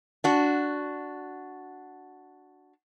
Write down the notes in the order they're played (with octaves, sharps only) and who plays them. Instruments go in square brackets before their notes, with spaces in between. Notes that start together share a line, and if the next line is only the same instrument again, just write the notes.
[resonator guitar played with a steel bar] D4 F#4